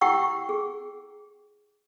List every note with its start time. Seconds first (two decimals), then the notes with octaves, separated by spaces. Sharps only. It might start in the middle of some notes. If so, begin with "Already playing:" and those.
0.01 E4 G4 F#5 G5 C#6 E6
0.49 G#4